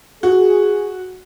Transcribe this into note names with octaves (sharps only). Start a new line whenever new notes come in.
F#4 G#4